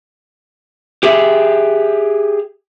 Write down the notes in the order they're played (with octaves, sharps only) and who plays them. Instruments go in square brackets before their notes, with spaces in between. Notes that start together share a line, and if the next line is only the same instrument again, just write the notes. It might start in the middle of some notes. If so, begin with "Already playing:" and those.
[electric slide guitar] G4 G#4 E5